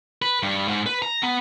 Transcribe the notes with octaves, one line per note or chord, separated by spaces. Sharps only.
B4
G2
G#2
B4
A#5
B3